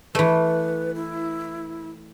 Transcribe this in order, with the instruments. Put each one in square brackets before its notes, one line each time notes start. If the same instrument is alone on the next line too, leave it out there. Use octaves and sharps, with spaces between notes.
[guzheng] E3 A3 [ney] B4
[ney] E4